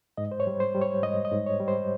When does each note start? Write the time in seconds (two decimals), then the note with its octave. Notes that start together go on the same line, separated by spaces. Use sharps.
0.17 G#2 D#5
0.31 C5
0.40 C#5
0.47 G3
0.60 C5
0.75 G3
0.82 C#5
1.03 G#2 D#5
1.25 D#5
1.32 G#2
1.46 C#5
1.60 G3
1.68 C5